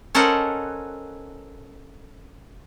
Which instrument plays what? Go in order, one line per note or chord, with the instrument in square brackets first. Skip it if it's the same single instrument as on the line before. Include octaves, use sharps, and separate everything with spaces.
[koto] C#4 A4 A#4 C5 D#5 F#5